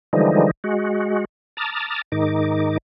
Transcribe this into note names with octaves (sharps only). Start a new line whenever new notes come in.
D3 E3 F3 G3 G#3 D#4
G#3 F#4
A5 A#5 D6 D#6 F6 A6
G#2 D#3 D#4 D6